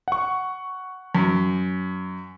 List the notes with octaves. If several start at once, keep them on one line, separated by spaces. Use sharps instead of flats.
F#5 C#6
F#2